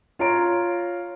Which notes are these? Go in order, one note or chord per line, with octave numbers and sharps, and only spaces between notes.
F4 C#5 A#5 D7